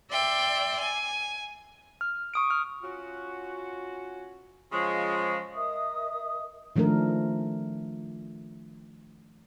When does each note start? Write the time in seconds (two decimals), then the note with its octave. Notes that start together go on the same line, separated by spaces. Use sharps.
0.11 D5 E5 G5 C6
0.79 G#5
2.01 F6
2.34 C#6 D#6 D7
2.50 F6
2.83 C#4 F4 F#4
4.72 C#3 F3 F#3 G#3 C#6
5.55 A#4 D#5 E5 D#6
6.76 D#3 F3 A3 D4 A#4